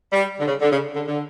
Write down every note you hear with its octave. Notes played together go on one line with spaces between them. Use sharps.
G3
D3
C#3
D3
C#3
D3
D3